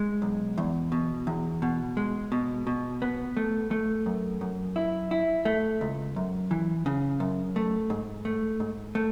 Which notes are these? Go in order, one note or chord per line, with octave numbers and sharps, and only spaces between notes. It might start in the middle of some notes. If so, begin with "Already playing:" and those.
Already playing: G#3
B1
E2
B2
E2
B2
G#3
B2
B2
B3
A3
A3
F#2
F#2
E4
E4
A3
C#2
F#2
E3
C#3
F#2
A3
G#2
A3
G#2
A3